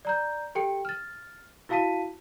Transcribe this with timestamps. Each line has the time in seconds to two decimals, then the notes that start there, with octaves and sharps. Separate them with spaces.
0.05 D5 A#5 G6
0.55 G4 A4 G5 C#7
0.85 F6 A6
1.69 E4 F#4 F5 A5 B6 D#7